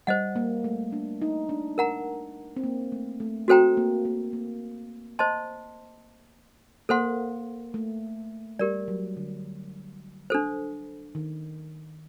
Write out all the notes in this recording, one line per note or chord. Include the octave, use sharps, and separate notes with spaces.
G3 C5 D#5 F#5
A#3
A3
D4
D#4
D4
A#4 F#5 A#5
C4
A#3
A3
A3
C4 F#4 A4 C5 G5 A#5
A#3
A#3
A#3
C5 D#5 A5 C6
A#3 A4 C5 F#5 C6
A3
G3 G4 A#4 D5
F#3
D3
D4 A4 C5
D#3